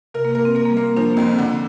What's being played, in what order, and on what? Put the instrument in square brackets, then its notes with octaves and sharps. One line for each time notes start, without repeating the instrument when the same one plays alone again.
[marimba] C3 [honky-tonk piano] A#4
[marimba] A#3
[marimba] A#3 [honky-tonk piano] A#4
[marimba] C4
[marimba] A#3 [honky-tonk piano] A#4
[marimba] A#3
G3
[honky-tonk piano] A#3
[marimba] C4
[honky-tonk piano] F3 [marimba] D4
[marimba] C4
[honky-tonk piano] F2 [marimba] A#3
[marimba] C4
[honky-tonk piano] D3